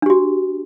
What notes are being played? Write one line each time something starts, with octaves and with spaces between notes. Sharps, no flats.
D4 F#4 G4